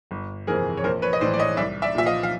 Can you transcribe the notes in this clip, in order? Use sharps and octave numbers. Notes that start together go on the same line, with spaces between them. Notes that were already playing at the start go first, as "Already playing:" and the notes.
G1
F2 C3 E3 G#4 A#4
C#5
A#1 A#4 C5
B4 C#5
D#5
A2 E3 C5 D5
D5
C#5 D#5
C2 D5 E5
D5 E5
A#2 F3 E5
D#5 F5
F5